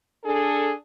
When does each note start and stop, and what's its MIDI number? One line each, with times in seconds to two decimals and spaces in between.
0.25 0.73 62
0.25 0.73 68
0.25 0.73 69